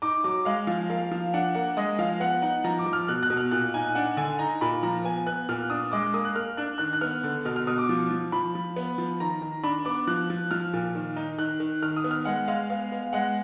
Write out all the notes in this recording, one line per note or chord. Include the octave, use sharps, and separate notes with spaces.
D#4 D6
F#3 D6
G#3 F5
F3 F5
A#3 F5
F3
D4 F#5
A#3 F#5
G#3 D#5
F3 F5
B3 F#5
D#4 F#5
F3 A#5
D6
F3
F6
B2 F#6
F#6
B2
F6
A#2 F#6
D#4 G#5
D4 F#5
D3 G#5
D#4 A#5
A#2 B5
F3 A#5
B3 G#5
B3 F#6
A#2 F6
D4 D#6
G#3 D6
A#3 D#6
F#6
A#3 F6
D4 F#6
D#3 F#6
F#6
B3 F6
D3
B2 F6
F6
B2 D#6
D6
F3
F3
F3 B5
F3
B3
F3
D#3 A#5
D#3
D4 B5
B3 D6
F3 F#6
F3
F3 F6
A#2
D#3
D#4
D#3 F#6
D#3
D#3 F6
D#6
B3
F6
G#3 F#5
G#3 F5
B3 F5
B3
G#3 F#5